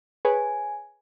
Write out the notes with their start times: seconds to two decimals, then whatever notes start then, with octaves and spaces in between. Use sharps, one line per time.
0.25 G#4 B4 C#5 G#5